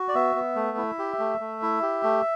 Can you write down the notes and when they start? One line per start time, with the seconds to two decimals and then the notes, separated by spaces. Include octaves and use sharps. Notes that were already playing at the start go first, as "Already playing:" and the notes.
Already playing: F#4
0.08 D5
0.15 B3 E5
0.36 B3
0.56 A3
0.78 E4
0.99 G4
1.19 A3
1.40 A3
1.62 E4
1.82 G4
2.03 A3